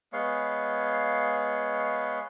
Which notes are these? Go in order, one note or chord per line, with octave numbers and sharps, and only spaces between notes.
G#3 B3 C#5 F5